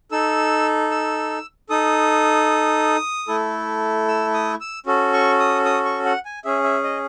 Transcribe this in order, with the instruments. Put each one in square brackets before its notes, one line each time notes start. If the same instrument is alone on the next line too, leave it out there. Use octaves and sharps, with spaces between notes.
[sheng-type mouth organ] D#4 A4 E6
E6
D#4 A4 D#6
A3 E4 A4
E6
D#6
E6
C#4 F#4 A4
C#6
D#6
D#6
C#6
F#5
G#5
C#4 G#4 E5
E5
D#5